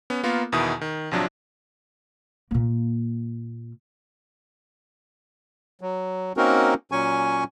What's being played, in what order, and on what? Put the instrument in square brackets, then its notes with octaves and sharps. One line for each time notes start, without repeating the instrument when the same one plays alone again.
[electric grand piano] B3 C#4
A#3 B3 F4 A#4
E2 B2 D#3 E4 D#6
D#3
A#1 C3 F3 F#3 D4
[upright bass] A#2 A#3
[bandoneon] F#3
A#3 C4 C#4 D#4 F#4 A#4
A#2 F#3 C#4 G#5 C#6